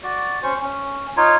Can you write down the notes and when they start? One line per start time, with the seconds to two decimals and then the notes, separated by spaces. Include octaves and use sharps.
0.03 F#4 D5
0.43 C#4 C5 C#6
0.62 C#4
1.17 D#4 F4 C#5